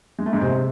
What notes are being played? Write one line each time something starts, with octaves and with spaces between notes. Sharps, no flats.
G#3
A3
G#2 G#3
C3 C4